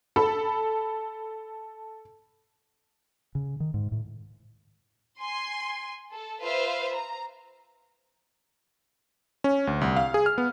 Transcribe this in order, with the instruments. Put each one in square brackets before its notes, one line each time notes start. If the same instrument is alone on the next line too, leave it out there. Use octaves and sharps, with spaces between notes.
[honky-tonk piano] A4 A5 B5
[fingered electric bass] C#3
D#3
G#2
A2
[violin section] G#5 C6
A4
F4 B4 C5 E5 F5
A#5
[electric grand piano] C#4
D2
C2
F5
G#4
F6
B3